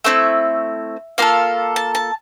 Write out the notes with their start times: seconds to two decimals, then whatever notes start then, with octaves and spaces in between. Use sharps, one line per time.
0.04 A3 C4 E4 E5
1.18 A#3 F4 A4 F5
1.76 A5
1.95 A5